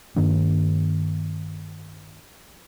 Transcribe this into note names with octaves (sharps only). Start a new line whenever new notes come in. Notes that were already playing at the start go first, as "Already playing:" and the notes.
G2 D#3 A#3 D4